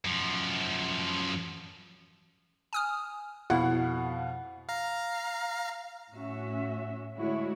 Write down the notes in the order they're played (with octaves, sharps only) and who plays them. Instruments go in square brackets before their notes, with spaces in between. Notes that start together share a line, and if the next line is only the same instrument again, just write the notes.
[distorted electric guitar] F#2 F3
[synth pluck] G#5 D#6 F6
[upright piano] F2 B2 F5 [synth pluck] E4 [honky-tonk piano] F#5
[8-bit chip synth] F5 A#5
[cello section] A2 C#4 F#4 E5
D3 G#3 A3 E4 F#4 C#5